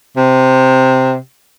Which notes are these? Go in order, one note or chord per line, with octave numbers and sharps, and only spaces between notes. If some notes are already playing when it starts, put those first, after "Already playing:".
C3